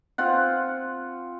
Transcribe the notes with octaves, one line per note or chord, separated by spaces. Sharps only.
C4 F4 F#5